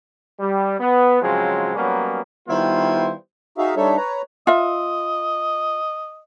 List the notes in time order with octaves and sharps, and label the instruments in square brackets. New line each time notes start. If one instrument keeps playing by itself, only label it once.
[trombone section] G3
B3
C#3 F3 F#3 G#3 C4
F#3 G3 A#3 B3 C#4
[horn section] D#3 G3 B3 E4 F4 C5
[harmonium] D#4 F#4 G#4 E5 F5
G3 D4 D#4 A4 C#5 E5
B4 C#5 A#5
[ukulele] F4 E5 [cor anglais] D#5